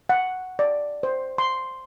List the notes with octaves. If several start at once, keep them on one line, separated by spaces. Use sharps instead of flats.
F#5
D5
C5
C6